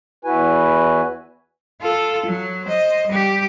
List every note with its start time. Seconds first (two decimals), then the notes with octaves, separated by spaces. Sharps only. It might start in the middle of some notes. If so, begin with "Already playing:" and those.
0.25 E2 E4 F#4 B4 G#5
1.81 F4 A4
2.26 F#3
2.65 C5 D#5
3.08 G3 G4